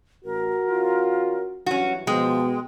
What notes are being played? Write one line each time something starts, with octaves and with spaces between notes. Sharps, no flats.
A1 F#4 A#4
F3 C#4 F4
G2 E3 F#3 C#4 F#4
B2 F3 G#3 G5